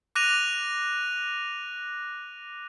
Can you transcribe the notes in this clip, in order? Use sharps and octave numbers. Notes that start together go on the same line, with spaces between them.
D6 F#6 A#6 D#7 F7